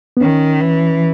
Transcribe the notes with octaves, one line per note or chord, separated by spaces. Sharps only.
B3
D#3 C#4
E3